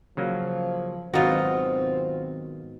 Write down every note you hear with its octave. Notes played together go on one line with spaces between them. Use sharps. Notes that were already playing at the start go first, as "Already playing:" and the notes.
C#3 F3 F#3 A#3
G#1 B2 F#3 C4 D#4 F4 F#4